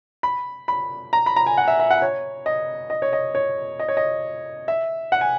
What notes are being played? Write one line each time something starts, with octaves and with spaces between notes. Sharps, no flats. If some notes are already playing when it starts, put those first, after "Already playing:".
B5
B5
A#5
B5
A#5
G#5
F#5
E5
E5
F#5
C#5
D#5
D#5
C#5
D#5
C#5
D#5
C#5
D#5
E5
F#5
G#5